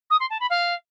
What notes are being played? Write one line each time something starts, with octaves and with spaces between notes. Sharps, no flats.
D#6
C6
A5
B5
F5